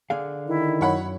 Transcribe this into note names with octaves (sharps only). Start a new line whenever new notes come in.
D3 G#4 F5
D#3 E4
F#2 C#5 F#5 B5